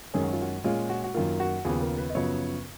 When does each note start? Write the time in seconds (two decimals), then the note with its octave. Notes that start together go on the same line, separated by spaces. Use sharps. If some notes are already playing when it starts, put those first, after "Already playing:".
0.14 F#2 D#3 G#3 C#4 G#4
0.23 F#4
0.33 F4
0.42 F#4
0.64 A#2 G#3 C#4 F4
0.89 F#4
1.04 F#4
1.14 F#2 D#3 A#3 F4
1.40 F#4
1.65 D#2 C#3 F3 B3 G#4
1.81 A#4
1.98 B4
2.10 D#5
2.15 F#2 C#3 F3 B3 C#5